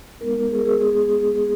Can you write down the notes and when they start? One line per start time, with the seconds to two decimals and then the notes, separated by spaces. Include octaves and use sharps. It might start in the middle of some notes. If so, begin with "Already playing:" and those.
0.21 G#3 B3 D#4 A#4
0.51 G#4
0.59 A#4
0.65 G#4
0.81 G#4
1.35 G#4